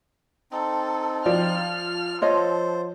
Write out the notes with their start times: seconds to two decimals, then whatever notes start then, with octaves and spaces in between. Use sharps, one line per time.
0.52 C4 D#4 A4
1.26 F3 D5 F6
2.22 F4 A4 C5 C#5 D#5